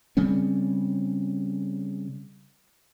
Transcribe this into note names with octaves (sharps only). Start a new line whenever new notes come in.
C#3 G3 C4 C#4